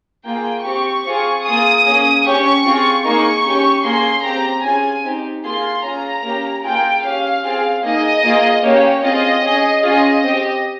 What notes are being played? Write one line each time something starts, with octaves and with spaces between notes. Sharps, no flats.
A#3 F4 G#4 G5
C4 G4 C#6
C4 F4 G#4
A#3 F4 G#4 D#6
A#3 C#4 G#4
C#4 G4 C#6
C4 F4 G#4
A#3 D#4 G#4 C#6
C#4 G4
A#3 C#4 G#4 C6
C4 G4 A#5
C#4 F4 G#4 G#5
C4 D#4 G4
A#3 F4 G#4 C6
C#4 F4 G#4 A#5
A#3 C#4 G4
A#3 F4 G#4 G5
C#4 G4 F5
C4 F4 G#4
A#3 D#4 G#4 D#5
A#3 F4 G#4
A#3 C#4 G4 C#5
C4 F4 G#4 D#5
C#4 G#4
C#4 F4 G#4 D#5
C4 G4